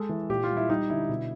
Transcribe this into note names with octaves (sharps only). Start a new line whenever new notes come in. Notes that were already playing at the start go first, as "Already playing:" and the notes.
Already playing: G#3 A4
E3
A#2 G4
F4
G3
E4
G3 D#4
D3 E4
B2